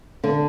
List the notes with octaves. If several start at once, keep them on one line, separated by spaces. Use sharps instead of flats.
D3 D4